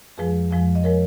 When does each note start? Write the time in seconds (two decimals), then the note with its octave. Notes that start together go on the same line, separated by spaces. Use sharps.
0.18 F2 F3 G#3 G#4 B4
0.51 F2 F3 G#3
0.75 D#5
0.84 F3 G#3 A#4 C#5